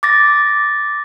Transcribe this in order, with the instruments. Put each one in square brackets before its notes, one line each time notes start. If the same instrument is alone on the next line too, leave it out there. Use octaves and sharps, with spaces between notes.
[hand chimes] D6 A6 A#6